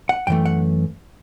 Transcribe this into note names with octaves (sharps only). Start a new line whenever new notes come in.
F#5
F#2 E3 A3 G5
F#5